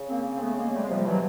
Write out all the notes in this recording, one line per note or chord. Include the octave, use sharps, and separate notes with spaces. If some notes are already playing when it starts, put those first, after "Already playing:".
Already playing: C#3
A#3 C4
C4
A3 B3
G#3 A#3
G3 A3
G#3
C3 F3 G3
B2 E3 F#3